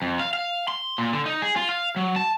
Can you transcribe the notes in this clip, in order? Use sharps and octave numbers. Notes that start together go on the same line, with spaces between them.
F2
F5
F5
C6
A#2
D3
D#4
G#4
F4
F5
F#3
A5